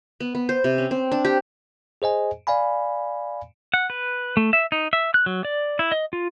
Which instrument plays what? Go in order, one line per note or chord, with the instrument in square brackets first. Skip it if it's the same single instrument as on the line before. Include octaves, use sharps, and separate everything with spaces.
[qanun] B3
B3
C5
C3
C#4
C4
D4
G4
[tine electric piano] G#4 C5 D#5 G#5
D5 F5 G#5 B5
[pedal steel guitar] F#5
B4
A3
E5
D#4
E5
F#6
F#3
D5
E4
D#5
F4